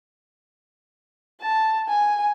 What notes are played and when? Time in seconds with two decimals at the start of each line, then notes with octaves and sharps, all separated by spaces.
1.41 A5
1.88 G#5